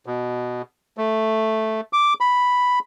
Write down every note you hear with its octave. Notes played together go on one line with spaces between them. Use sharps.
B2
A3
D6
B5